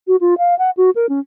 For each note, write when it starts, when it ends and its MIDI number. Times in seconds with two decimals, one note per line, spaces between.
0.07 0.16 66
0.21 0.34 65
0.38 0.57 77
0.59 0.70 78
0.77 0.90 66
0.95 1.06 70
1.09 1.20 61